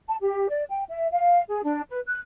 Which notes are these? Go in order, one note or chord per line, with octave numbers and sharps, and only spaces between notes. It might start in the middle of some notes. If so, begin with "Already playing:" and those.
A5
G4
D5
G5
E5
F5
G#4
D4
B4
F#6